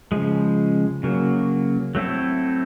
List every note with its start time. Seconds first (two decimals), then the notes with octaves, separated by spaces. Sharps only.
0.12 C#3 F3 G#3
1.03 C#3 F#3 A#3
1.95 F#3 A3 C4 E4 A4